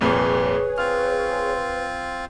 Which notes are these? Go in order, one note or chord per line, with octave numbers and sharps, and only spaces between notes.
C2 F2 A#2 G#4 B4 C#5
C4 F4 F6